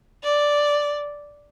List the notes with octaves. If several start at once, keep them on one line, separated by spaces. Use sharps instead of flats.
D5